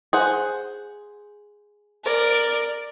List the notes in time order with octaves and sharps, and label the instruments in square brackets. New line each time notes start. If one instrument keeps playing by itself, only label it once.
[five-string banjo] G#4 C5 F#5
[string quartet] A#4 D5